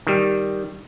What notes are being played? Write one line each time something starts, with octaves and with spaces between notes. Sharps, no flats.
D#3 G3